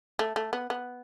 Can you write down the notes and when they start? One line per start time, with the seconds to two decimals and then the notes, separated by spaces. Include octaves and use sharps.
0.19 A3
0.36 A3
0.53 B3
0.70 B3